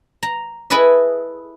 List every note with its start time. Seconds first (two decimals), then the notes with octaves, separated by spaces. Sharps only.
0.23 A#5
0.70 E4 G#4 A4 B4 D#5 E5